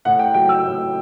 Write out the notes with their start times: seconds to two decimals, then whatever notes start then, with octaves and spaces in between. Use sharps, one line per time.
0.05 A2 F#5
0.19 G5
0.34 F#3 G5
0.49 E6
0.64 A2